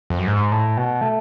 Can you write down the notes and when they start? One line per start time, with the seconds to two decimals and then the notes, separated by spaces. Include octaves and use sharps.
0.10 F2
0.18 F#2
0.27 G#2
0.52 A2
0.77 B2
1.01 A3